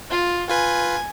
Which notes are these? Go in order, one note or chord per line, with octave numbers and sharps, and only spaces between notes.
F4
F4 B4 G#5